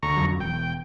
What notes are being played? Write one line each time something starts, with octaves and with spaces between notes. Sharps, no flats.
D2 A#5 C#6
F2 F#3
E1 E2 G5